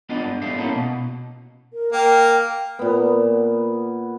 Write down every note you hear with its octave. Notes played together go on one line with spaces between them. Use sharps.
B3 D4 F4 A4 D#5
G2
B3 D#4 G4 A4 E5 F5
A2 A#3 C#4 E4 F#4 A4
B2
A#4
A#3 G5
A#2 B3